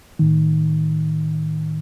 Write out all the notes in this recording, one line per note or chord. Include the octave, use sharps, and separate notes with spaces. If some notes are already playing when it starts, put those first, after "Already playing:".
A2 D#3